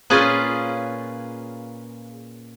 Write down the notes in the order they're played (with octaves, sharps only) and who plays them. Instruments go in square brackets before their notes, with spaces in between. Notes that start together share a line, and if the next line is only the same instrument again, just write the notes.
[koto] A#2 C#4 F4 G#4 B4